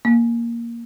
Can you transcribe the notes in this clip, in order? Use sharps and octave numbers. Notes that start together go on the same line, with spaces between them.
A#3